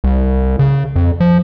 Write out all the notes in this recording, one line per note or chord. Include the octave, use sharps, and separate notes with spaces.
C2
C#3
F2
F3